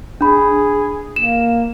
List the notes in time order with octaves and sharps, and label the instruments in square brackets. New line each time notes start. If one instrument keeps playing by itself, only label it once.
[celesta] D4 B5 [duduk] G#4
[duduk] A#3 [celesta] E7